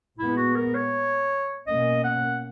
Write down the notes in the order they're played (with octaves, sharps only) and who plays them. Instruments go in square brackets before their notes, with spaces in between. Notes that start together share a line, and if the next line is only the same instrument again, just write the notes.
[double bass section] A#2 G#3 B3 [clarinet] E4
[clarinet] F#4
A#4
C#5
[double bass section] B2 A#3 C#4 [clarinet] D#5
[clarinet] F#5